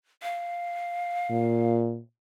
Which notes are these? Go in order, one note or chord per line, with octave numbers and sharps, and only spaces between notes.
F5
A#2